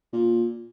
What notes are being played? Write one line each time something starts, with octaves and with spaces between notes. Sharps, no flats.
A#2